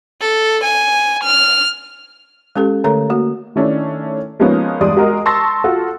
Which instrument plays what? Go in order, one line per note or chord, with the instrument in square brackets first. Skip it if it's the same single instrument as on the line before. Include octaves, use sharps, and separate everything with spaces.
[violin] A4
G#5
F6
[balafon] G#3 C#4 G4 A4
D3 A3 A4 C#5 A#5
A#3 F#4
[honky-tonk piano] D#3 A3 C#4 D4 E4
F3 G#3 A#3 B3 C#4 D#4
E2 G2 G#3 D5 C6 D#6
G#3 F#4 G#4 A#4 D#5
A5 C6 C#6 E6 A6 A#6
F4 F#4 A4